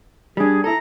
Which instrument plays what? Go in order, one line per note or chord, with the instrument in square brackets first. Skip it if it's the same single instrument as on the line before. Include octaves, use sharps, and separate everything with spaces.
[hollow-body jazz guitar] G3 D4 [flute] G#4
[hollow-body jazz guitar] E4 A4 [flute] A#5